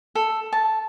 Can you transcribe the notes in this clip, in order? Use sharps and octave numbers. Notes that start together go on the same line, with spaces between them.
A4
A5